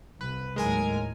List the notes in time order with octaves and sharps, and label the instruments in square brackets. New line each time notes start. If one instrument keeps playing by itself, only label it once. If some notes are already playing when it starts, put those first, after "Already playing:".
[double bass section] C2 [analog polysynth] B4
[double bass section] D#2 A2 F#3 [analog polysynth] G#3 A#4 G#5